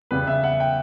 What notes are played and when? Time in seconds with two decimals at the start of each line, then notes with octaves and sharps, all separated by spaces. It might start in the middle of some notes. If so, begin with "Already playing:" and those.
0.11 E2 C#3 G3 B3 B4
0.27 E5
0.44 F#5
0.60 G5